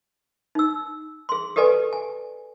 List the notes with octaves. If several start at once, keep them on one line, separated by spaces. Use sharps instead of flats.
D#4 E6
G#4 C6
G4 A4 B4 D5 G#5
G#5